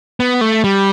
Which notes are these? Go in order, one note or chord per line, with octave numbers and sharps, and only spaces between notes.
B3
A3
G3